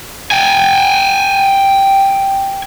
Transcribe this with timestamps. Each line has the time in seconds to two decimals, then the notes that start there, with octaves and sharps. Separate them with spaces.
0.31 G5 G#5